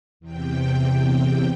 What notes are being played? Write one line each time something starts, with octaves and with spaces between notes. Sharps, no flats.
E2 C3 G5